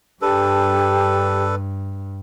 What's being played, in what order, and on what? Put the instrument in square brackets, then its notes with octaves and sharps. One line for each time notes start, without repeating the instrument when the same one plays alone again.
[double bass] G2 [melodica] D4 A4 B4 [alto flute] G4